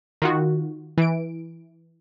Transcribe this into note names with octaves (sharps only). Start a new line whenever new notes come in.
D#3 F4 F#4
E3 D7